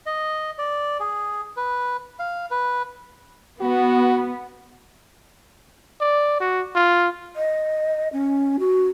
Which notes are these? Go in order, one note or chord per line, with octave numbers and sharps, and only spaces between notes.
D#5
D5
G#4
B4
F5
B4
B3 F#4
D5
F#4
F4
D#5
C#4
F#4